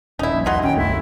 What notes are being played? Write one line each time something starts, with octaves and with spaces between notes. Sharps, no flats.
D#1 C#4 D#4 E4
A#1 G2
D#2 F#3 D#4 C6
D#3 C#4 G5
C2 F#2 A3 E4